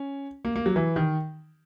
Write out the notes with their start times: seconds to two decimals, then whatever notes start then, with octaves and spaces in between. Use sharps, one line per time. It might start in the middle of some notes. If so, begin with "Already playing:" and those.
Already playing: C#4
0.45 A#3
0.56 A#3
0.66 F#3
0.76 E3
0.96 D#3